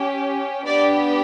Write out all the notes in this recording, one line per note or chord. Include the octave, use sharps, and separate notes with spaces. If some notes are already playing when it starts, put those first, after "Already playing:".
Already playing: C#4 G4
B3 D4 G4 D5